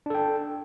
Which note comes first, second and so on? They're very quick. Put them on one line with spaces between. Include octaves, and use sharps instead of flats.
D4 A4 G5